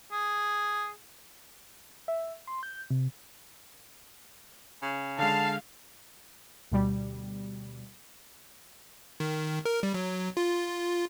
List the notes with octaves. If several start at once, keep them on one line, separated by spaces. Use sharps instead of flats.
G#4
E5
C6
G6
C3
C#3
D3 G#3 F5 A5
D2 B2 G3
D#3
A#4
G3
F#3
F4